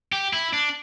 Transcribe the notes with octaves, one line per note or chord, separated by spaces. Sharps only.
G4
E4
D4